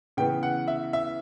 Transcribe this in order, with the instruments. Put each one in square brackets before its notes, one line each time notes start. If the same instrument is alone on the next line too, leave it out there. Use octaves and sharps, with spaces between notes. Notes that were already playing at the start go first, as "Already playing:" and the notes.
[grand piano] C#3 E3 B3 G5
F#5
E5
E5